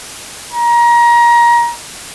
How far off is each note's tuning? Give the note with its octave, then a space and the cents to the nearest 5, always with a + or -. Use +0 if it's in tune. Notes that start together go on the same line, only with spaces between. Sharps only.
A#5 +25